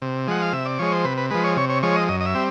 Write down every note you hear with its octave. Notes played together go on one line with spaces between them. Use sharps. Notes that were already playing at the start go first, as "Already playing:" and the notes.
C3
F3 G#3 F#5
F5
C3 E5
D5
F3 G#3 C#5
C5
C3 B4
B4
F3 G#3 B4
C#5
C3 C#5
C#5
F3 G#3 C#5
D#5
F#2 D#5
D#5
E5
G3 C4